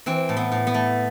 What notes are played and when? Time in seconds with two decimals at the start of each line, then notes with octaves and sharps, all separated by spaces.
0.06 E3 C4
0.29 A2
0.37 B3
0.52 A2
0.67 B3
0.74 A3